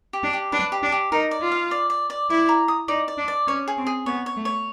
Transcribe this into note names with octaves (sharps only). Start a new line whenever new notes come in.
G4
D4
G4
D4 B4
G4
D4
G4
D#4 A#4
D5
F4
F5
D5
D5
D5
E4 D5
A#5
D#6
D#4 D5
D5
D4
D5
C#4 C#5
G#4
C4
G#4
B3 C#5
C#5
A3
C#5